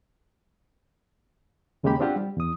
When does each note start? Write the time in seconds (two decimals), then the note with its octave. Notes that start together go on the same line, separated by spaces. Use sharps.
1.83 D#2 C#3 G#3 A#3 G4 B5
2.00 C4 D4 F4 G4 F#5
2.16 G3
2.37 E2 D#6